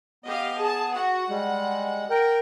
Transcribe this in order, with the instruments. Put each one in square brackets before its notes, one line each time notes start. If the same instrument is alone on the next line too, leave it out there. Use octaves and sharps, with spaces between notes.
[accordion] B3 [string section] G4 D#5 F5
[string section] G#4 A5
[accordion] F#4 [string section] F#5
[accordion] G3 G#3
A#4 G5